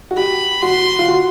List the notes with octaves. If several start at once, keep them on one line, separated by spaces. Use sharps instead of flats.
F#4
G4 B5
F#4 C6
F4
F#4